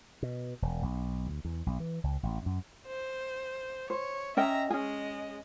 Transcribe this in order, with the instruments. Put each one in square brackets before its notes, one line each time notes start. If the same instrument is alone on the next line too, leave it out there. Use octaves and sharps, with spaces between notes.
[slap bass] B2
E1
B1
D2
E2
B1
E3
C#2
A1
F#2
[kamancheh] C5
[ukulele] C5 [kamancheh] C#5
[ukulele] C#4 D#5 G5 [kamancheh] E5 A#5
[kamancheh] G#3 D#5 [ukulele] C#4 G#4